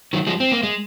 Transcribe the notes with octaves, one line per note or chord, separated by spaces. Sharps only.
D#3 F#3
F3 G#3
C4
A#3
G#3